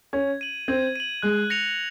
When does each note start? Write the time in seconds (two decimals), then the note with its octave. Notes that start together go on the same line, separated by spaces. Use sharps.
0.13 C#4 G#6
0.41 D#7 F#7
0.68 C4 G#6
0.96 D#7 F#7
1.23 G#3 F#6
1.50 A#6 C#7 F7